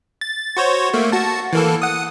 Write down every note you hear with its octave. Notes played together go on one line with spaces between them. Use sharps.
A6
F#4 C5 C#5
A3 A#3
F#4 A5
E3 A#3 A4
F#5 D#6